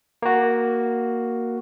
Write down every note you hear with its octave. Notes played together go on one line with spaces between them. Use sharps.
A#3 F#4